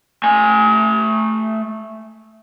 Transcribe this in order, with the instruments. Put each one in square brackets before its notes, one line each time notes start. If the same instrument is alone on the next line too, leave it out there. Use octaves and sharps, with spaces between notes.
[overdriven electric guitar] A3 G#5